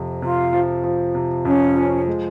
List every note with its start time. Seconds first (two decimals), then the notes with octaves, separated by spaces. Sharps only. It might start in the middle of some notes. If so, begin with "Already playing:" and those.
Already playing: F2 C3
0.22 C3 F4
0.53 F3
0.84 F3
1.15 C3
1.45 F2 C#4
1.76 F3
2.07 G#3